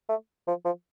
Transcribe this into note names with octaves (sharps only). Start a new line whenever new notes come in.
A3
F3
F3